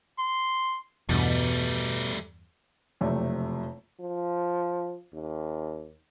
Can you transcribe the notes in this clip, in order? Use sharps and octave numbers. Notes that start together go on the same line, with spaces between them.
C6
E2 G2 B2 G3 A3
F#1 F2 C3 A3 D5
F3
D#2